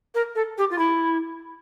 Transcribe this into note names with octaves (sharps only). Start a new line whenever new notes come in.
A#4
A4
G4
F4
E4